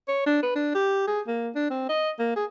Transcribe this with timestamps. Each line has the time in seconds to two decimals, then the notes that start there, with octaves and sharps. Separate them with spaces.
0.08 C#5
0.26 D4
0.43 B4
0.55 D4
0.75 G4
1.07 G#4
1.27 A#3
1.55 D4
1.70 C4
1.89 D#5
2.19 A#3
2.36 G#4